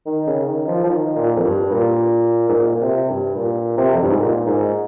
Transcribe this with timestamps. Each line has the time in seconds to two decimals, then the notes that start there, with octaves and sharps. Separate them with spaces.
0.06 D#3
0.27 C#3
0.48 D#3
0.68 F3
0.84 F3
0.89 D#3
1.16 A#2
1.36 F2
1.44 G2
1.71 A#2
2.49 G#2
2.54 A#2
2.75 A#2
2.81 C3
3.10 G2
3.36 A#2
3.78 C3
3.93 F2
4.02 G2
4.11 G#2
4.20 A#2
4.46 G#2